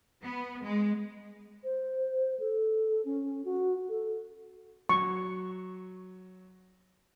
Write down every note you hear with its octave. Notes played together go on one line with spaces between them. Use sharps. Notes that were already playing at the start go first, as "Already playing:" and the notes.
B3
G#3
C5
A4
C#4
F#4
A4
F#3 C#6